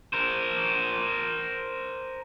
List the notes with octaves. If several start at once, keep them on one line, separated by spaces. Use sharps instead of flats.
A#4 C5